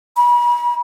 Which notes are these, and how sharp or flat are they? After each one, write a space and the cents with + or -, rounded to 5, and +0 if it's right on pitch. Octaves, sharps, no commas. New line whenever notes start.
B5 -40